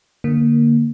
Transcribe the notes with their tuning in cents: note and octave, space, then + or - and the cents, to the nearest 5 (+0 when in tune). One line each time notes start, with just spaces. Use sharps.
D3 +0 A#3 +0